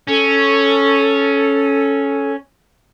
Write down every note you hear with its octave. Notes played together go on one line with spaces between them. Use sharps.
C#4 A4